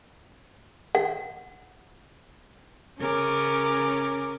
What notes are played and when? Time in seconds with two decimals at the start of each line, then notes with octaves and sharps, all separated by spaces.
0.95 F#5
2.99 C#3 C#4 A#4 D6